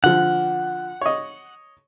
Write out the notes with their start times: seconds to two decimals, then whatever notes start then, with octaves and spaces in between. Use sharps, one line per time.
0.04 D3 F3 F#5
1.01 C#5 D#5